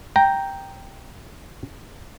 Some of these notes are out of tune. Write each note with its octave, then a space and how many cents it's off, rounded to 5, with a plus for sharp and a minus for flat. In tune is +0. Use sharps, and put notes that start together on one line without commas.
G5 +0 A#5 +0